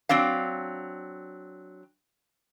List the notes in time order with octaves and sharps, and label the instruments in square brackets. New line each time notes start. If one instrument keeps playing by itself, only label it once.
[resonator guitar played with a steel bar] F#3 C4 D4 F5